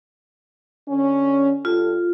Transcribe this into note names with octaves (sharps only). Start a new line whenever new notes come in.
D3 C#4
G2 F4 G4 A4